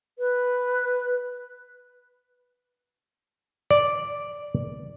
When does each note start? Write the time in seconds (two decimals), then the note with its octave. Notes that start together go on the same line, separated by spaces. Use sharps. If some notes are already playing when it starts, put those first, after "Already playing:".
0.19 B4
3.71 D5